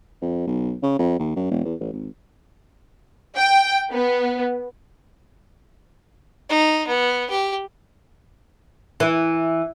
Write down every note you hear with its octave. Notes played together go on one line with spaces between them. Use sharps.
F2
B1
C#3
F2
D#2
F#2
E1
E2
A1
G#1
G5
B3
D#4
B3
G4
E3